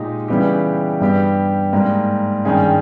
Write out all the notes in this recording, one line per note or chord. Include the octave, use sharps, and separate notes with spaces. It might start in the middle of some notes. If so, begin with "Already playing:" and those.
Already playing: A#2 G#3 D#4 G4
C#3 E3 G3 B3 G4
G2 G3 B3 G4
G#2 G3 A#3
G2 D#3 G3 C#4 G#4